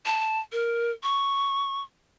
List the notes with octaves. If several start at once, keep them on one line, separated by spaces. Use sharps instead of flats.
A5
A#4
C#6